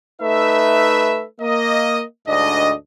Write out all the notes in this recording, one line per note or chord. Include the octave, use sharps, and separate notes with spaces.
A3 D#4 B4 E5
A#3 D#5
D2 G#2 D4 D#5